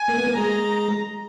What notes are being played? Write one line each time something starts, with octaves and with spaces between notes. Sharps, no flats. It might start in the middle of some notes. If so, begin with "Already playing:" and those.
Already playing: G#5
A#3 A#4
B3 B4
A#3 A#4
G#3 G#4 A#5